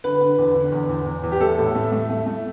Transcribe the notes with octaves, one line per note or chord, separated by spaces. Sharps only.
D3 B4
D3
E2
D3
E2
E2
E2
E2
G4
A3 A4
A2
A3
A3
A3
A3